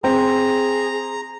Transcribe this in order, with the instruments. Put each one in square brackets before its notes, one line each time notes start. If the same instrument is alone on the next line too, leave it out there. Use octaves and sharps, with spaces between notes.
[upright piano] C4 [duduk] G#4 [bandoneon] A#5